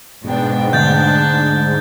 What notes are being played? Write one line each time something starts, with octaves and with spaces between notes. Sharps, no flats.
G#2 B2 D4 G5
D2 D4 G6 A6